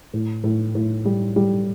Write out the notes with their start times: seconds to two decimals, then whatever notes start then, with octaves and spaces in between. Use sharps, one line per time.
0.14 A2
0.44 A2
0.75 A2
1.05 G3
1.36 G3